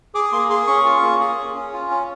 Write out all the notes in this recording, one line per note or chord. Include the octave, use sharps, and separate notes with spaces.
G#4 D6
A#3 C6
G#4 C6
C#4 C#6
F4
A#3
G#4
C#4
C#4
F4
C#4